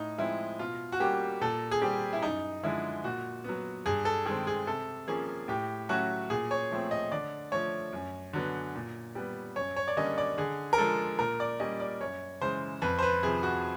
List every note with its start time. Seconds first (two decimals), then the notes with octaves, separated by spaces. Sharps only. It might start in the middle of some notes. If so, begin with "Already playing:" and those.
Already playing: A2 D#4
0.18 F3 G#3 C4 E4
0.59 B2 F4
0.92 F#4
1.00 G3 A#3 C#4 G4
1.41 A#2 A4
1.71 G#4
1.82 G3 C4 G4
2.13 E4
2.22 F#2 D#4
2.63 D3 F3 G#3 E4
3.04 A#2 F#4
3.44 F#3 B3
3.86 G2 G#4
4.05 A4
4.26 D#3 G#3 C4 G#4
4.47 G#4
4.67 C3 A4
5.08 F3 A#3 C#4 G#4
5.48 A2 G4
5.89 F#3 A3 C#4 F#4
6.30 A#2 G#4
6.51 C#5
6.71 F3 A3 C4
6.91 D#5
7.12 D3 D5
7.52 F3 A3 C#5
7.93 F#2
8.33 D3 F#3 B3
8.75 A#2
9.15 G3 B3
9.56 F#2 C#5
9.76 C#5
9.88 D5
9.97 D3 G3 A#3 C#4 D#5
10.18 D5
10.38 D3 G#4
10.73 A#4
10.78 F3 G#3 A4
11.19 A#2 A#4
11.40 D5
11.59 G3 A#3 C#4 D#5
11.80 D5
12.01 F#2 C#5
12.41 C#3 E3 G#3 C5
12.82 F2 B4
12.99 C5
13.02 B4
13.23 C3 F3 G#4
13.43 F#4